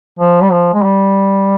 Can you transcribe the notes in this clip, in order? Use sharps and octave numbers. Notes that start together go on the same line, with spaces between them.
F3
G3
F3
G#3
G3